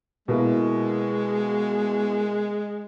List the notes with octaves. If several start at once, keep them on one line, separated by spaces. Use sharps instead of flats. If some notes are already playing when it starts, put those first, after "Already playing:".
B2 G#3 A#3 E4